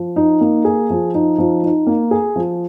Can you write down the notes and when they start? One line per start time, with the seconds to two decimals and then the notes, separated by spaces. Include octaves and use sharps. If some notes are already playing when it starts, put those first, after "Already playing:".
Already playing: F3
0.16 D#4
0.41 A#3
0.65 G#4
0.90 F3
1.14 D#4
1.38 F3
1.63 D#4
1.87 A#3
2.11 G#4
2.36 F3